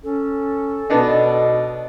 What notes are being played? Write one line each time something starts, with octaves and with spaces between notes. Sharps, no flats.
C#4 A4
B2 B3 D4 D#4